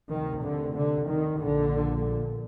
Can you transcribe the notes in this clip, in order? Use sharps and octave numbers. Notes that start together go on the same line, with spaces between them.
D2 C3 D#3
D3
D3
D#3
A#1 A#2 D3